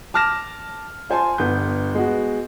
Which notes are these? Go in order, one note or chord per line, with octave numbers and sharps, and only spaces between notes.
A5 D6 F6 A#6 E7
F4 C5 G#5 A5 C6
G1 B3 G6
G#3 B3 F#4